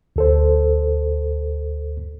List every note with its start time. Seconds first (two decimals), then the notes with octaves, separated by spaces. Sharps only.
0.16 D2 A4 C5